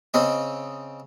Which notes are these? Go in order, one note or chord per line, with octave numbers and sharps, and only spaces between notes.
C#3 C4 D#5